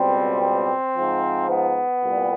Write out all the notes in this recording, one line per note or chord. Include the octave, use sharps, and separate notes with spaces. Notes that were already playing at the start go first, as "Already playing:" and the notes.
Already playing: C#2 B2 G3 C4
C4
F3
G#2
B3
C2 A#2 G3